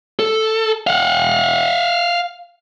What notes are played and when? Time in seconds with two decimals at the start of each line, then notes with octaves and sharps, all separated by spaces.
0.19 A4
0.87 F5 F#5